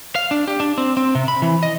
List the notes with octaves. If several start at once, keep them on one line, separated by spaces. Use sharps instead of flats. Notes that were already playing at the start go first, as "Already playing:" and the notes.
F5
D4
G4
D4
C4
C4
C3
B5
E3
D#5